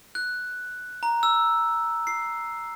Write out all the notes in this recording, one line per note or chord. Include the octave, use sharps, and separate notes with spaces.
F#6
A#5
E6
C7